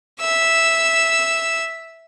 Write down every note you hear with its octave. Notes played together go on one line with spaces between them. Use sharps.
E5 E6